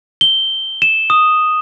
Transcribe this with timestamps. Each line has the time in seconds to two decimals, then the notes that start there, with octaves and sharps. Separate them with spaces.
0.21 G7
0.82 E7
1.10 D#6